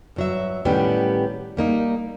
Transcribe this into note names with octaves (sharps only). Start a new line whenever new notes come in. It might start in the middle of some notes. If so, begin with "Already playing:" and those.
G2 F#3 E5
A2 D#3 G3 B3 C#4 G4
G3 A#3 D#4